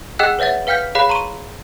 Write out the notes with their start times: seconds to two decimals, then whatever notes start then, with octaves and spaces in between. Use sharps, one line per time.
0.19 G#4 D#5 F#5 G5 E6 F#6
0.39 B4 C#5 E5 F#5 A6
0.67 B4 F5 G5 F6 G6 B6
0.95 G#4 C#5 F5 B5 F#6 C7
1.09 A#5 C6 C#6 D#7